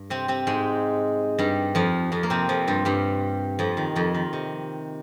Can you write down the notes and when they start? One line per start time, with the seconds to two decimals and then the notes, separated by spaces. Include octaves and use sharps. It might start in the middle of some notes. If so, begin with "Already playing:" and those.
Already playing: G2
0.10 C3 C4
0.28 C3 C4
0.47 G#2 G#3
1.39 G2 G3
1.75 F2 F3
2.12 F2 F3
2.23 A#3
2.30 C3 C4
2.49 F2 F3
2.67 G2 G3
2.85 G2 G3
3.59 F2 F3
3.77 D#3
3.96 F2 F3
4.14 D#3
4.33 C3